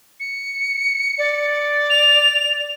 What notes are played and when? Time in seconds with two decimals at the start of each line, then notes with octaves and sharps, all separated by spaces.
0.20 C#7
1.18 D5
1.90 F7